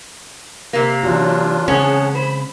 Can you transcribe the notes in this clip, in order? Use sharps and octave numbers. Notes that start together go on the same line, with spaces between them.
C3 A#3
E3 F#3 C#4 D4 F4 F#4
C#3 G#3 C4 C#4 G#4 F#5 A5
C5 B5